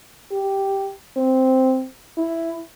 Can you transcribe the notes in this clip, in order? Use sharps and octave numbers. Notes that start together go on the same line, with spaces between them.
G4
C4
E4